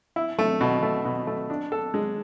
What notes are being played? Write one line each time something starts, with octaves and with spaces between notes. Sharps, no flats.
E4
A3
B2
A3
B2
A3
D4
A4
G#3